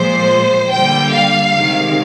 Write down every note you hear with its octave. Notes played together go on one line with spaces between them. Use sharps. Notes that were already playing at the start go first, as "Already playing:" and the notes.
Already playing: A#2 F3 G#3 C5
D3 G3 A#3 G5
F5
C3 D#3 G#3